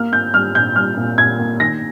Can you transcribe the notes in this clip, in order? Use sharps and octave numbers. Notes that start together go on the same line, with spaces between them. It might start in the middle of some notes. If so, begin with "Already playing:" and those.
Already playing: A#3 F6
A#3 G6
G3 F6
A#2 G6
G3 F6
A#2
A#2 G#6
A#3
D#3 A#6